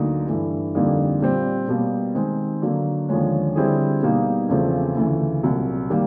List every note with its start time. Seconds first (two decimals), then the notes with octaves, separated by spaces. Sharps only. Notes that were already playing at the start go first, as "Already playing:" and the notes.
Already playing: D2 D3 F#3 A#3 D#4
0.28 G2 E3 A3
0.75 F2 D3 G3 A#3 D#4
1.22 A#2 G3 C4
1.68 B2 G3 A#3
2.15 D#3 G#3 C4 D#4
2.62 D3 F#3 A#3
3.09 D#2 D3 F3 G#3 C#4
3.55 D3 G3 C4 E4 G#4
4.03 B2 G3 A#3 D#4
4.49 E2 C#3 F3 A3 C4
4.96 D2 C#3 E3 A3
5.43 C2 A#2 F#3
5.90 D#3 G3 A#3